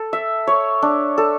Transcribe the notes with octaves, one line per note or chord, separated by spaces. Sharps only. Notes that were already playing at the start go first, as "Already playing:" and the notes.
Already playing: A4
E5
C#5
D4
A4